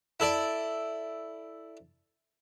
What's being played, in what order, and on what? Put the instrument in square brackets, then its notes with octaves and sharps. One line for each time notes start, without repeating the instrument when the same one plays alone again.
[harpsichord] E4 A4 D5